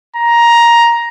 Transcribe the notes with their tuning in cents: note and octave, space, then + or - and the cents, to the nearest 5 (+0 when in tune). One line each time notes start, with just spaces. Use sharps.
A#5 +10